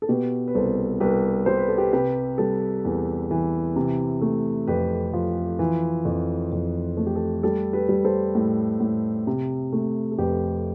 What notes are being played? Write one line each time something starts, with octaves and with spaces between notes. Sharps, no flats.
A4
B2 G4 B4
B4
C2 A4 C5
C2 G4 B4
G3 C5
B4
A4
G4 B4
C3 G4 B4
G3 A4
E2
E3
C3
A3
F2 G4 B4
F3
E3
F2
F2
A3 A4
G4
A4
G3 A4
G4 B4
G3
A4 C5
A2
A2
C3
A3
A4
F2 G4 B4